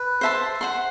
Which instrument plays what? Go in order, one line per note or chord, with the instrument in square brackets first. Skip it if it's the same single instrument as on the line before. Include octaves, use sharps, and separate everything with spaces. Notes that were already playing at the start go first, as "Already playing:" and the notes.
Already playing: [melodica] B4
[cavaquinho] C5 E5 A5 C6
C5 F#5 C6